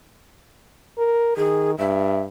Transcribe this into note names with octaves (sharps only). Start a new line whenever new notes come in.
A#4
D#3 G#4
G2 E5